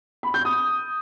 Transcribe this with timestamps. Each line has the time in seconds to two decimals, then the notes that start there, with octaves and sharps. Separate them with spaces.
0.23 B5
0.34 G6
0.45 D#6